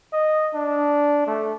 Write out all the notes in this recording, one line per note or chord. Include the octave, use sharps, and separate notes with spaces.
D#5
D4
A3